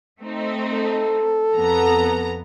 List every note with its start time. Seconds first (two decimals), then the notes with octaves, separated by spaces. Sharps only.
0.20 A3 C4 D#4
0.73 A4
1.53 F2 B3 A#5